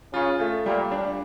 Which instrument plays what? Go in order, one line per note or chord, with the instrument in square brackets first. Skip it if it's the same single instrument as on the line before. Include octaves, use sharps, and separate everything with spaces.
[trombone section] C#3 [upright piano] F4
[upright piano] A3
[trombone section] A#2 [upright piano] G3
[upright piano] D4